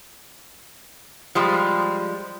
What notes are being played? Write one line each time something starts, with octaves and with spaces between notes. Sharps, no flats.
F3 G3 G#3